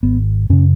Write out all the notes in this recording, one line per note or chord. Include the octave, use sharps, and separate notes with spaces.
G#1 B3
F#2 C#3 C#4